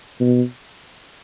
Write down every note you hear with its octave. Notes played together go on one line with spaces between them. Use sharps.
B2